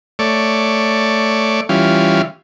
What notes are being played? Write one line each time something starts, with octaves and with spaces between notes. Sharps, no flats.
A3 C#5 D5
E3 G3 C#4 F4